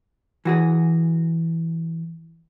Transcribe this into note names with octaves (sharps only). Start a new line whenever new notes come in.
E3 F#4 G#4